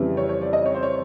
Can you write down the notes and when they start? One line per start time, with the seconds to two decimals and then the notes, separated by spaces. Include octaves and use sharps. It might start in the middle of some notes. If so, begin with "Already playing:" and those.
Already playing: F2 C#3 E3 G3
0.17 C#5
0.29 C#5
0.41 D5
0.53 D#5
0.66 C#5
0.75 C5
0.83 C#5